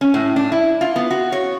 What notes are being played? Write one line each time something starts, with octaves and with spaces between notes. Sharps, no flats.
C#4
A2
D4
E4
F4
B3
F#4
C#5